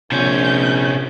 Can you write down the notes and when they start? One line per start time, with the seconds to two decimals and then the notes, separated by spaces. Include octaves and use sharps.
0.12 A#1 C3 C#4 G6